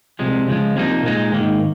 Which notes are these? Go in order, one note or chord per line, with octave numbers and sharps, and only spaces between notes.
C2 C3 F3 G#3
C#2 C#3 F3 G#3
C2 C3 F3 A#3 D#4
A#2 G#3 D#4
G#2 D#3 A#3